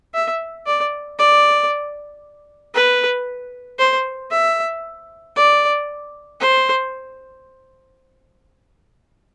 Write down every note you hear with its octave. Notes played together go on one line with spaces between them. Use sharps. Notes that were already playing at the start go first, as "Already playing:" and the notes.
E5
D5
D5
B4
C5
E5
D5
C5